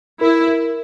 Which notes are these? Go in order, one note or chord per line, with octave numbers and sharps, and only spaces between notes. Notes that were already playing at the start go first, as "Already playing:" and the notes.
E4 A#4
A#4